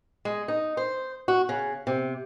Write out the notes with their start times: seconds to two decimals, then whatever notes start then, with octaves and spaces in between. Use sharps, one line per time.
0.25 G#3
0.48 D#4
0.77 C5
1.28 F#4
1.49 C#3
1.87 C3